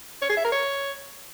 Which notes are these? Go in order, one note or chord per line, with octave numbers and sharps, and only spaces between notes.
C#5
G#4
E5
A#4
C#5